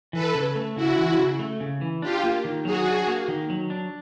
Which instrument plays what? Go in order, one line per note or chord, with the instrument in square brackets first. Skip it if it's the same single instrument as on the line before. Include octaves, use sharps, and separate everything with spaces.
[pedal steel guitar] E3 [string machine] A4 B4
[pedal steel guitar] C#3
A3
[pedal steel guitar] C#3 [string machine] E4 F#4
[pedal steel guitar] E3
C#3
A3
C#3
E3
[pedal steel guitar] D4 [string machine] F4 G4
[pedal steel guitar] A#3
D#3
[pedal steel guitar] F#3 [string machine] F#4 G#4
[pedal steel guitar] D4
A#3
D#3
F#3
D4